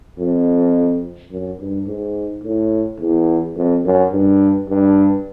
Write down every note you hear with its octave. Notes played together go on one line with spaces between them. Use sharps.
F2
F#2
G2
G#2
A2
E2
F2
F#2
G2
G2